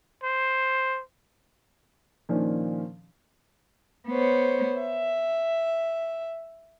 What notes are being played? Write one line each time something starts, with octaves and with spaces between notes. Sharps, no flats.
C5
A#2 D#3 F3 C#4 D4
B3 C5 C#5
E5